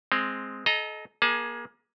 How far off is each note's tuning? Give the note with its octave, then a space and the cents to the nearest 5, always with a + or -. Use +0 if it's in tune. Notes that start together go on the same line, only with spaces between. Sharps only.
G#3 +0 C4 +0
A4 -35 D#5 +0 A#5 +0
A#3 +30 G#4 +10 A5 +5